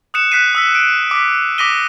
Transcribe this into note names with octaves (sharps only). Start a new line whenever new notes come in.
D#6 F#6 C#7 E7
F#6 B6 C7 D#7
D#6 E6 B6
D7
D6 B6
D6 D#6 A#6 B6 D#7 G7